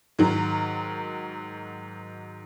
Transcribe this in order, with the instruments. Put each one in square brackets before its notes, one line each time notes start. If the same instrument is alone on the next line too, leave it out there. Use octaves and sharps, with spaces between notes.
[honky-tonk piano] G#2 D#3 F#3